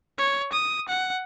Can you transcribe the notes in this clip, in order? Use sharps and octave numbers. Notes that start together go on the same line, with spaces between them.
C#5
D#6
F#5